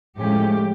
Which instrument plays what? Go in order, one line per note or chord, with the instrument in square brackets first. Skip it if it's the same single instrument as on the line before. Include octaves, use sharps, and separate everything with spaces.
[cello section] A2 F3 G#3 C#4 G4